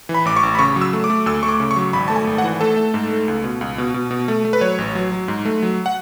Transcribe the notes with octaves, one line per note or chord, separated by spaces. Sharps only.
E3
B5
A1 D6
C#6
A1
B5
C#3 C#6
F#3
E6
A3
D6
A3
D2 E6
A3 C#6
D6
C#3
C#6
F#3
G#1 B5
A3 A5
G#5
G#1
F#5
E3
A3 A4
A3
G#2
A3
C#2
B2
C#2
B2
B2
B2
A3
A3
B4
F#3 C#5
A1
F#3
F#3
G#2
A3
F#3
F#5